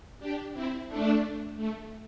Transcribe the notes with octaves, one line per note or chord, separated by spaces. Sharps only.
D4 G4
C4 E4
A3 D4
A3